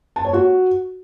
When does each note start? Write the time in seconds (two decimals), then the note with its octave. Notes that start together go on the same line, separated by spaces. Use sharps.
0.16 A5
0.25 C#5
0.33 F#4